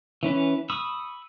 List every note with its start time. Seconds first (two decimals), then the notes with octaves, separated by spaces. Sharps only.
0.23 E3 C#4 B4
0.70 B5 C#6 D#6 E6